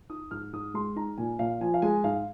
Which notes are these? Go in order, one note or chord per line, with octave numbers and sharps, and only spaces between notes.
D#4 D#6
G#2 F6
G#2 D#6
G#3 C6
D#4 A#5
A#2 G#5
A#2 F5
F3 G#5
F5
G#3 G#5
G#2 F5